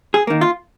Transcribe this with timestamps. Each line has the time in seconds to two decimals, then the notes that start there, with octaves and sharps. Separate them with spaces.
0.14 G#4
0.27 D#3 A#3
0.41 F4